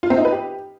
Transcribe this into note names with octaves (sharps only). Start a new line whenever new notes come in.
F4
C4
D#4
B4
G4